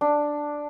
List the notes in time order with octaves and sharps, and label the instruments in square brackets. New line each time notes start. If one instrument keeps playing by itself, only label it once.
[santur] D4